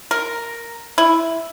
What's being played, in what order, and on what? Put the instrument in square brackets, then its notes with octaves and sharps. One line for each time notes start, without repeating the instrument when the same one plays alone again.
[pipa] A#4
E4